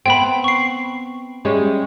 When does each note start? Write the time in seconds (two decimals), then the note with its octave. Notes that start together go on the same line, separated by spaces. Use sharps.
0.06 B3 C4 G5 B5
0.44 C#6 C7
1.45 G3 G#3 C#4